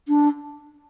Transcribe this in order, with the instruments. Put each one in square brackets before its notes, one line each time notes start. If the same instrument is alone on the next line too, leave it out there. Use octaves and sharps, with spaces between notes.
[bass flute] D4